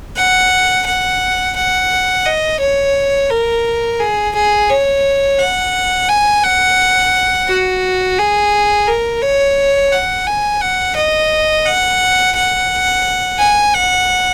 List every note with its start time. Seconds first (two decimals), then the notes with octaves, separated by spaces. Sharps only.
0.17 F#5
0.86 F#5
1.57 F#5
2.26 D#5
2.60 C#5
3.31 A#4
4.00 G#4
4.35 G#4
4.69 C#5
5.39 F#5
6.09 G#5
6.44 F#5
7.48 F#4
8.18 G#4
8.87 A#4
9.22 C#5
9.92 F#5
10.27 G#5
10.61 F#5
10.96 D#5
11.66 F#5
12.36 F#5
13.39 G#5
13.74 F#5